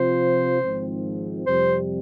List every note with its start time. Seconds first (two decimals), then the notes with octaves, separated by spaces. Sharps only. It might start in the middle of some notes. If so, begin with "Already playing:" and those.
Already playing: C3 F3 C4 F4 C5
0.60 G#1 G#2 F3 C4
1.46 F2 C3 G3 C5